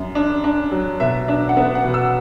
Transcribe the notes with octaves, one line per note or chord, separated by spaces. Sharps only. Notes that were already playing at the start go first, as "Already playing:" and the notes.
Already playing: F#2
D4
D4
F#3
B2 E5
D4 E5
F#5
B3 E5
F#5
B2
E6